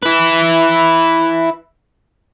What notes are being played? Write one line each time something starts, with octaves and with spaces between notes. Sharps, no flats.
E4 B4